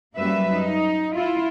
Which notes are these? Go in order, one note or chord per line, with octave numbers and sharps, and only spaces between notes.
F#2 F#3 G3 A#3 B4 E5
D#4
E4 F4